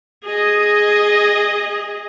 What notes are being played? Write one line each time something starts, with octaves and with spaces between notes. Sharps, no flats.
G#4 D#5